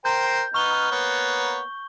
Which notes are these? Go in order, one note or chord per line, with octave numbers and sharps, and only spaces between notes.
A#4 C5 G5 G6
B3 D#4 C#6 F6 G7
A#3 B3 C#5